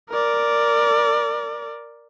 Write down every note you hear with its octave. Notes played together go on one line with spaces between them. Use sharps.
A#4 D5